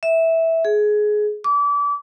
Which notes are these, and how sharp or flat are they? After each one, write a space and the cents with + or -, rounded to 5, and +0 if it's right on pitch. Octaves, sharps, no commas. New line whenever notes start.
E5 -10
G#4 +20
D6 -30